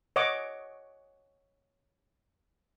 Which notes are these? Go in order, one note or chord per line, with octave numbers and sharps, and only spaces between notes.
C#5 D#5 F#5 C#6 D6